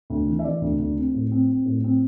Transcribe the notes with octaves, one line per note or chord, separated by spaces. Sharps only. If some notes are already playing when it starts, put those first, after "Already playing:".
D2
E3
E5
E3 D5
D2
D2
C4
A2
C4
C4
A2
C4